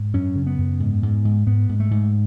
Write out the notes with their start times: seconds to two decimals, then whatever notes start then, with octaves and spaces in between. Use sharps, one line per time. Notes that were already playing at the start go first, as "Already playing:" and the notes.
Already playing: G#2
0.14 F#2 C#4
0.36 C#3
0.47 B3
0.58 F#2
0.80 G#2
1.03 G#2
1.25 G#2
1.46 G#2 B3
1.69 G#2
1.80 A3
1.91 G#2